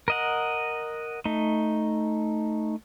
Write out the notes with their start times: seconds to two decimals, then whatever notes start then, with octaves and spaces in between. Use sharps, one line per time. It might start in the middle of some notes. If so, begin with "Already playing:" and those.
0.08 A#4 D#5 F#5
1.26 A3 D#4